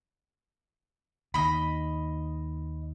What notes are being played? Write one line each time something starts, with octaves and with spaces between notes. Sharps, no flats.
D#2 D#5 B5